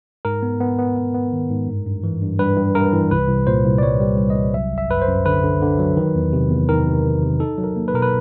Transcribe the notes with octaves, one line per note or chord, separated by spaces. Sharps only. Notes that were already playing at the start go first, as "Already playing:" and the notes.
G#2 A#4
B3
B3
B3
B3
B3
D#3
G#2
G2
G2
E3
G2
G2 B4
G2
G2 A#4
E3
C2 B4
C2
A#2 C5
C2
D5
G3 C#5
G3
C2
D#5
C2
F#3 E5
G1
E5
F#2 B4
C5
F#2
D3 B4
D3
D3
F#3
D#3
E2
C3
E2
D#3 A#4
C3
C3
C3
D#4 A4
F#3
A#4
A#3
B4
B2 A#4
B4